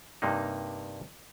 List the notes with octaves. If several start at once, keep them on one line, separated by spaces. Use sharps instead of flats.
G2 C3 A#3 D#4